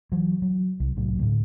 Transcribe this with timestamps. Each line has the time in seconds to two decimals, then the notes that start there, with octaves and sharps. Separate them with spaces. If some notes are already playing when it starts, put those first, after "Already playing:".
0.12 E3 F#3
0.42 F#3
0.80 C2
0.96 C2 A2 F#3
1.19 D2 A2